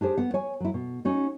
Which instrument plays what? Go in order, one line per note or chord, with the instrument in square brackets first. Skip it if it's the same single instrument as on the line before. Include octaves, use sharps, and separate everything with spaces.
[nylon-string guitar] D4 G4 G#4 C5
B3 F#5
C#5 G#5
F#3 E4
B2
C#4 D#4 F#4